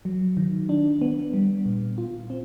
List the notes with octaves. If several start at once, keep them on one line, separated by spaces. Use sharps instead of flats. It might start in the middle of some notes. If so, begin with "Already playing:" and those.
F#3
D#3
D4
B3
G3
A#2
F4
C4